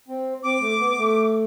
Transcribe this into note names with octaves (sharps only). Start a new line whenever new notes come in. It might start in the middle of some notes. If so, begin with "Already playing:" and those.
C4
C4 D6
A3
B3
A3